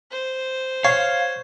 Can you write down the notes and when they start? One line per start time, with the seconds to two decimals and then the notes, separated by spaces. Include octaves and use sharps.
0.11 C5
0.85 C#5 F5